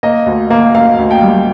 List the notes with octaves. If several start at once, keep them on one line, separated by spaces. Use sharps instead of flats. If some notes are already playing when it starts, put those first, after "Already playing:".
A#3 D#5
D2
A#3
A#3 F5
D2
G5
G3